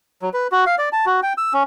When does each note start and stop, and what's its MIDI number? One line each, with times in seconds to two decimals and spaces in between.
0.22 0.29 54
0.34 0.47 71
0.52 0.65 66
0.66 0.75 77
0.78 0.89 74
0.93 1.05 81
1.06 1.20 66
1.23 1.33 79
1.38 1.53 88
1.53 1.63 61